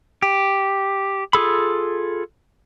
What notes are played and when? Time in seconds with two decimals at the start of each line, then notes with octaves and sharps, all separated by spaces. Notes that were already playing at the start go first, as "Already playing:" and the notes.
0.22 G4
1.33 F4 G#4 A4 B5